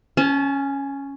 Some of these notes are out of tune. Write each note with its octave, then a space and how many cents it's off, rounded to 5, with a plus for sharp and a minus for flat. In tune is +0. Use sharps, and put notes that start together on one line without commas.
C#4 +0 A5 -35